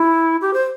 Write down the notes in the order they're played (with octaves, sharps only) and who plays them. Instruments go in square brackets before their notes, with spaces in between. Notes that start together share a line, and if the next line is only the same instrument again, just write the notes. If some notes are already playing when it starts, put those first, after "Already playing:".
Already playing: [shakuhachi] E4
G4
C5